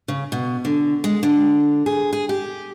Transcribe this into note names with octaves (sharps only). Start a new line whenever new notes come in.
C#3
B2
D3
G#3
D3
G#4
G#4
G4